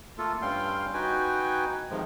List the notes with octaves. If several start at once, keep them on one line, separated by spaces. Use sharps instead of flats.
A3 A#3 F4 A4
G2 G3 C#4 F5 G5 C6
D#4 F#4 B4 G5 G#5
G#2 C3 D#3 F3 G#3